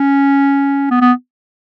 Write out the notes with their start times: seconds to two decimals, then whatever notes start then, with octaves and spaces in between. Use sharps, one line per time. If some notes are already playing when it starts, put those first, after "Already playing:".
Already playing: C#4
0.91 B3
1.01 B3